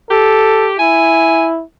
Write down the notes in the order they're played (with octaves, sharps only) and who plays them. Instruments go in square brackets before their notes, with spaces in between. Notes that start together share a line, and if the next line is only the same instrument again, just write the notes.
[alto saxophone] G4 [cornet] A4
[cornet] E4 [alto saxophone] G#5